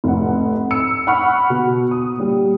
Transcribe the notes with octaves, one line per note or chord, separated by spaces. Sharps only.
F1 A2 F#5
E6 C#7
F#5 B5 C#6 F6
B2
D#6
A#2 G3